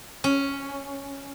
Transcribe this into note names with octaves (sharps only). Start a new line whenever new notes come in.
C#4